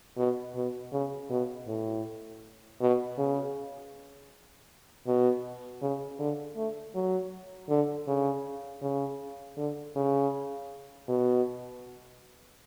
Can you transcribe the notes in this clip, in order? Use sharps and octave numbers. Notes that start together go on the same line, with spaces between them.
B2
B2
C#3
B2
A2
B2
C#3
B2
C#3
D3
A3
F#3
D3
C#3
C#3
D3
C#3
B2